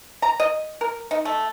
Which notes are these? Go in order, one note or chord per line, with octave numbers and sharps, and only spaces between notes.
A#5
D#5
A#4
D#4
A3